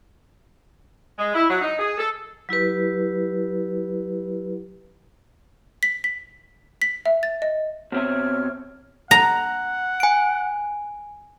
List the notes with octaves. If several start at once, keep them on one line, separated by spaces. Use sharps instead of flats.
G#3
E4
F#3
D#4
G#4
A4
F#3 E4 G4 B4
B6
B6
B6
E5
A6
D#5
B2 C4 C#5 E5 F6
F#5 A#5
G#5 D7